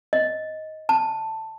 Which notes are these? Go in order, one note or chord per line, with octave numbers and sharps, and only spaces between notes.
D#5
A5